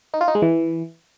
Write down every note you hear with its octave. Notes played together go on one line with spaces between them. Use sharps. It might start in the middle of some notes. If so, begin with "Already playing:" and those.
D#4
F4
D#4
G#3
E3